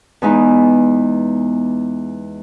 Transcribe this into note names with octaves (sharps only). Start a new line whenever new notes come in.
E2 G#3 B3 D#4